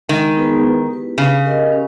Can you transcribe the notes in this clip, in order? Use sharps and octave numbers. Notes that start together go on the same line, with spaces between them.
D#3 G#3
B3 D#4 G#4 B4
E4
G4 B4
C#3 C#4
G4 A#4 D#5
C#4